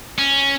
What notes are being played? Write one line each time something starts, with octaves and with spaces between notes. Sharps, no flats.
C#4